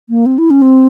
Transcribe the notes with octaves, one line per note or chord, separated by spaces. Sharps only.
A#3
C4
E4
C#4
C4